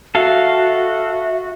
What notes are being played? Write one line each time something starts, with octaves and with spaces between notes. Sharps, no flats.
F#4 A4 E5 F5